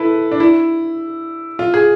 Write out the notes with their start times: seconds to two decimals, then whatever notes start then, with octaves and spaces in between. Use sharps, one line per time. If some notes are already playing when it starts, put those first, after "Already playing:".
Already playing: E4 A4 B4
0.31 D4
0.40 E4
1.59 F4
1.74 G#4